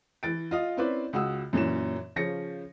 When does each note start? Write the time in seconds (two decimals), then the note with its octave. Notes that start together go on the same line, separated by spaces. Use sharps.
0.23 E3 A6 D7
0.51 F4 D#5 F5
0.77 C4 C#4 E4 B4 C5 D5
1.13 C#2 F#4 D#6 E6
1.53 F#2 A#2 E3 C#4 E7
2.16 C#3 F3 C#4 A#6 C#7